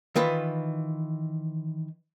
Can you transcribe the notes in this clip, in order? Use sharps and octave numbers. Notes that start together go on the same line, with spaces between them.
D#3 E3 F4 B4